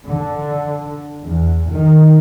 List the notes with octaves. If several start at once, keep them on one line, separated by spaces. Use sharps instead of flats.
D3
E2
D#3